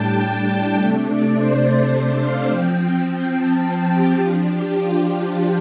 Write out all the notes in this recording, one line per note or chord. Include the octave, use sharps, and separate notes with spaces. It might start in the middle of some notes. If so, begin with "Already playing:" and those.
Already playing: A2 G3 D4 G5 A5
C3 A3 D4 G5
D5
C5
C5
D5
F5
F3 C4 G5
A5
A5
G4
F3 D4 F4
G4
F4
F4